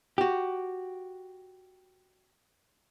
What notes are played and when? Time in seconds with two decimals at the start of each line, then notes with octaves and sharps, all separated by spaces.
0.18 F#4 G4